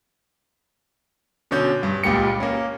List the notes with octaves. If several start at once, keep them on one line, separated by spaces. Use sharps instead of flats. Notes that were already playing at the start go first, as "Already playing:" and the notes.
B2 D3 C#4 G6
G2
C#2 A#2 G3 G5 C#7
A#3 C#4